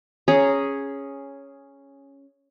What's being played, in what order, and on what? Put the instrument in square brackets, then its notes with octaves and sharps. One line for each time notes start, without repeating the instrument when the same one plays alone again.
[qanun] C#4 G#4 A#5